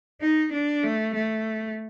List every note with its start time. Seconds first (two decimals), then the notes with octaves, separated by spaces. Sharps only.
0.21 D#4
0.53 D4
0.83 A3
1.14 A3